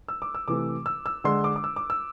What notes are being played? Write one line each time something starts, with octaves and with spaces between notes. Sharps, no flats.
E6
D6
E6
C3 E3 A3 D6
E6
E6
D3 G#3 C6
D6
D6
E6
D6
E6